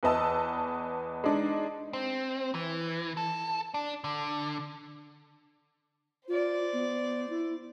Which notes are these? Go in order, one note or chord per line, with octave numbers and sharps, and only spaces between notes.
E2 B4 D#5 A5 E6
G#3 D4 D#4
C4
E3
A4
D4
D3
F4 C5 D5
B3
E4